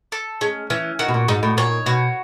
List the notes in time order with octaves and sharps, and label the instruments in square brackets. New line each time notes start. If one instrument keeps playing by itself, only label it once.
[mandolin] A4
[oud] G#3 [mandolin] C#4
[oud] E3 [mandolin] C#4
[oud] D#3 [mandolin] F#4
[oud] B2
A#2
[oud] G#2 [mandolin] D#4
[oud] A2
[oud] A#2 [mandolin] C#5
[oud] B2 [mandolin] F#4